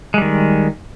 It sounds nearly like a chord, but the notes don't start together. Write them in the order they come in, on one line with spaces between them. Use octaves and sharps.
G#3 G3 D#3